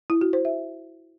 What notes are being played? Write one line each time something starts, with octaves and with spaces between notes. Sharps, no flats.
E4
F#4
C5
E5